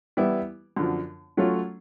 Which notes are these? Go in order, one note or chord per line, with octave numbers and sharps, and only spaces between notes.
E3 G3 B3 E4
F#2 D3 F3
F#3 A3 C#4 F4